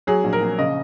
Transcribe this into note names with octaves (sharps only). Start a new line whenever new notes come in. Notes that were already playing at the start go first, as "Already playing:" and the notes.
F#3 G#4
A#1
A#4
A#1
C#3 D#5